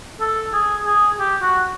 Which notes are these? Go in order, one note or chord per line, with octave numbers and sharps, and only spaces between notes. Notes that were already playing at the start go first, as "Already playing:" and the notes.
A4
G#4
G#4
G4
F#4